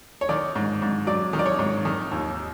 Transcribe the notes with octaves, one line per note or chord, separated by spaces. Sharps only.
C#5
D#3 D5
G#2
G#2
F#3 D5
D#3
D5
C#5
G#2
D#3
D#2